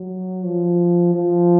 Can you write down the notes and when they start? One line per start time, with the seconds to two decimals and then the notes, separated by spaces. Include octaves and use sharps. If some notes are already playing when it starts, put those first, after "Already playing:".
Already playing: F#3
0.45 F3
1.14 F3